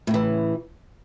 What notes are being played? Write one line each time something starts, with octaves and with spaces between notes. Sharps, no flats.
A2 C#3 E3